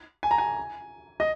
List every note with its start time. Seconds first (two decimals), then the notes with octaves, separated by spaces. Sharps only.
0.23 G#5
0.31 A#5
0.38 G#5
1.20 D#5